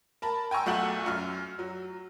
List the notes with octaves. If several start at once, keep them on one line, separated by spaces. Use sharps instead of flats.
A#4 A5 B5
G5 G#5 A#5 C#6 E6
B1 A3 F#4 G6 F#7
F#2 F6
F#3